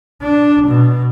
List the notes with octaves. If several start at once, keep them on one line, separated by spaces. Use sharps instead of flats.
D4
B2